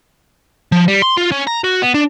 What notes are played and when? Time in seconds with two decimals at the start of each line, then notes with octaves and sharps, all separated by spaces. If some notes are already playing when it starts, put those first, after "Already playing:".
0.72 F3
0.88 G3
1.02 C6
1.17 F4
1.32 C#4
1.47 A#5
1.64 F#4
1.82 B3
1.94 D4